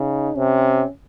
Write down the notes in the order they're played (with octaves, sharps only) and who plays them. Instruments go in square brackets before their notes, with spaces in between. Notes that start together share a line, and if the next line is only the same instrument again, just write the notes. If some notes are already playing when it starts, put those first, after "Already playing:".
Already playing: [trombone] C#3 [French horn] D#4
[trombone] C3 [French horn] C#4